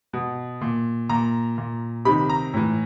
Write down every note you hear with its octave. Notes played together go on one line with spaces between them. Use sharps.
B2
A#2
A#2 A#5
A#2
C3 D#3 B5
A#5
A2 E3